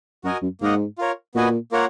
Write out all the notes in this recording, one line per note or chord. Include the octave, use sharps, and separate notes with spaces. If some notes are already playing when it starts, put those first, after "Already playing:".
F#2 F#4 A#4 D#5 G#5
F#2
G#2 A#3 D#4 A#4 D#5 F#5
F4 A#4 C#5
A#2 B3 F#4 B4 D#5 G#5
A#3 F4 A#4 C#5 F#5